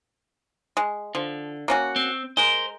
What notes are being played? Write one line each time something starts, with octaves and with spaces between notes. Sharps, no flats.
G#3
D3 F3
A#3 C#4 F#4
C4
G#3 A#4 C5